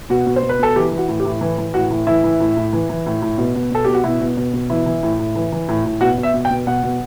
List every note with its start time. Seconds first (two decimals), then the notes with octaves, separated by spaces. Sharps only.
0.10 B2 F#4
0.26 B2
0.36 C5
0.42 B2
0.49 B4
0.59 B2 A4
0.76 E3 G4
0.92 E3
0.98 F#4
1.08 A2
1.20 G4
1.25 A2
1.41 E3
1.58 E3
1.74 A2 F#4
1.90 A2
2.07 E3 E4
2.24 E3
2.40 A2
2.57 A2
2.73 E3
2.90 E3
3.06 A2
3.22 A2
3.38 B2
3.55 B2
3.71 B2 A4
3.85 B2 G4
3.94 F#4
4.04 B2 E4
4.21 B2
4.37 B2
4.53 B2
4.70 E3 E4
4.86 E3
5.03 A2
5.19 A2
5.36 E3
5.52 E3
5.68 A2
5.85 A2
6.01 B2 F#4
6.18 B2
6.23 E5
6.34 B2
6.45 G5
6.51 B2
6.67 B2 F#5
6.83 B2